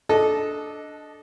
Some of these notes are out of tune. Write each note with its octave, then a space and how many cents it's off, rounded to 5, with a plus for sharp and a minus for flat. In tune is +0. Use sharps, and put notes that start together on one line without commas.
D4 +0 A4 -20 D#5 +0